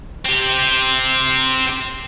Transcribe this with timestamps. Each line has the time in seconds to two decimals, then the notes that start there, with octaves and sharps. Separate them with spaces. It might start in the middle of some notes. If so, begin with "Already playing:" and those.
0.25 C4 G4